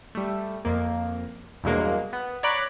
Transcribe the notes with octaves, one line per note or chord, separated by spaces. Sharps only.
G3 A3
F2 A#3
E2 G2 B2 F#3 G#3 A#3
B3
C#5 D5 A#5 B5 D6 F#6